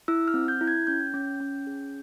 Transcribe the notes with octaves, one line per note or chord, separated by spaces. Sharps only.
E4 E6
F6
C4
G6
E4
G#6
C#4 G6
C#4
C#4
G#4